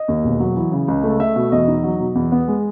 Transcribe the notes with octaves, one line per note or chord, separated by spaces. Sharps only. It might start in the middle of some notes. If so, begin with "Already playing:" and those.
Already playing: D#5
D#2
E1
F#3
E3
C#3
C#2
A3
A3 E5
B2
E2 D#5
D#4
F#3
B2
E2
B3
G#3